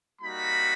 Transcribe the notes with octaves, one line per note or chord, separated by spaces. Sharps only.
G3 A#3 D#4 F#4 B5